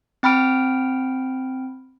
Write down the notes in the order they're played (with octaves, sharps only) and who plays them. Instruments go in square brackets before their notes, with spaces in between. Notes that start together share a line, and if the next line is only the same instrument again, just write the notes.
[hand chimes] C4 G5 B5 F6 D7